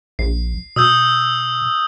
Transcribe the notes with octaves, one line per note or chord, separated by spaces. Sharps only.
A#1 C7
B2 D#6 E6 G6